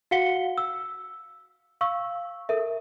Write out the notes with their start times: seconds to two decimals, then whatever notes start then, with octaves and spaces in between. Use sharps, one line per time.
0.11 F#4 F5 F#5 B6 C#7 G7
0.58 E6
1.81 F5 C#6 E6
2.49 A4 A#4 E5